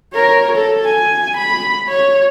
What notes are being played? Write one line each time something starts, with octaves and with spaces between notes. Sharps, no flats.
A#4 C#5
A4
G#5
B5
C#5